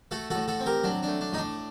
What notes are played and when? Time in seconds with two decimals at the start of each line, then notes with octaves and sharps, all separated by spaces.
0.11 A3 F#4 A4
0.30 A2 F#4 A4
0.48 F#4 A4
0.60 C4
0.66 G4 A#4
0.84 F#3 D4
1.03 A3 D4
1.21 D4
1.33 A2 D#4
1.38 D4